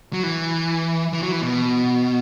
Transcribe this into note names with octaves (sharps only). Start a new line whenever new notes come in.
F#3
E3
E3
F#3
E3
B2